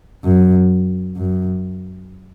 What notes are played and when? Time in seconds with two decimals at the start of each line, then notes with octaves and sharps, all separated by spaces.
0.24 F#2
1.16 F#2